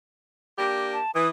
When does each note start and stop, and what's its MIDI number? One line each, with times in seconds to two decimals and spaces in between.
0.58 0.98 58
0.58 0.98 62
0.58 0.98 67
0.93 1.11 81
1.15 1.28 52
1.15 1.28 87